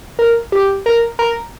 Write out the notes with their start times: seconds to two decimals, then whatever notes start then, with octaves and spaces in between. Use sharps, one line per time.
0.19 A#4
0.52 G4
0.86 A#4
1.19 A#4